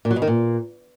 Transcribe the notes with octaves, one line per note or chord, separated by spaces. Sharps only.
A#2
F#3
B2
D#3
A#2